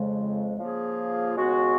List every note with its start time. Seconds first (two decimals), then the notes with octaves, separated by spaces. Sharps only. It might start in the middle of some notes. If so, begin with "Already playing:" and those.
Already playing: F2 C#3 G#3
0.58 C#3 F3 A#3 F4 G#4
1.35 D#2 C#3 G#3 B3 F#4